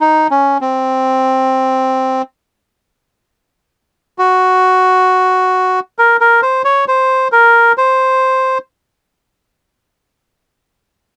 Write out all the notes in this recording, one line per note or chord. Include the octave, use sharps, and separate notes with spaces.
D#4
C#4
C4
F#4
A#4
A#4
C5
C#5
C5
A#4
C5